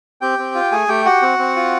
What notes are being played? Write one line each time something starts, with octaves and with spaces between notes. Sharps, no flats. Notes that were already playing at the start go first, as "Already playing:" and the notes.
C4 G4 G5
C4
F4
A3 G#4 G#5
A3 G4 G5
F#4 G4 F#5
C4
C4
F4